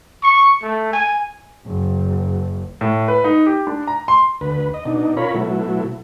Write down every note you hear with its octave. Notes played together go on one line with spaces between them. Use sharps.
C#6
A3
G#5
F#1
A2
B4
D#4
G4
D4
A#5
C6
D2 B4
D#5
B2 D4 D#4
C#4 F4 A#4 C#5 B5
B2 F#3 A3 E4